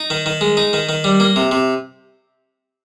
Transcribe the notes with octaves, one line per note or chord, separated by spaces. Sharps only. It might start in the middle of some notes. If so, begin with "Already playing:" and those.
Already playing: D#4
D#3
D#3
G#3
D#4
D#3
D#3
G3
A#3
C3
C3